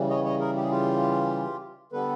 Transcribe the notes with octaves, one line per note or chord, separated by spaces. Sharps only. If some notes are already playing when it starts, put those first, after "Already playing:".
Already playing: C#3 E3 G3
C#5 D#5
C#5 D#5
G#4 A#4
G4
G#4
F4 G4
D3 G3 B3 A4 B4